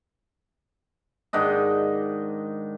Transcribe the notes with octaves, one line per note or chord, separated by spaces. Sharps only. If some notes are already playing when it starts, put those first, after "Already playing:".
G#2 D#3 D4 D#5